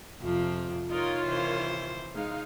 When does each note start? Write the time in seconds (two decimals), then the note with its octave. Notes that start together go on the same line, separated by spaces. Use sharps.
0.21 F2 C3 F3
0.91 D#3 D#4 F4 A#4 C#5 D#5
1.27 C3 E3 C5
2.14 G#3 D#4 F5